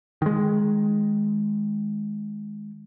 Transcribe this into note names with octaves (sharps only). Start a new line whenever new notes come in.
D#3 G#3